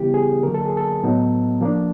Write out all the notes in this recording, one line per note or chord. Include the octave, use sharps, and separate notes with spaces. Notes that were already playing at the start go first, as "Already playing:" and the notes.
Already playing: C#3 E3 G3 B3 E4 G4
G#4
D3 F#3 A#3 A#4
A4
G#4
A4
A2 F#3 B3 D#4
F3 A#3 D4